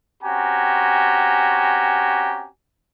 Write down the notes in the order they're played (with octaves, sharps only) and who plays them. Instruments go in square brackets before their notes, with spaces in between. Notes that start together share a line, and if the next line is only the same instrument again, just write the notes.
[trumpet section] C4 C#4 F#4 G4 G#5 A#5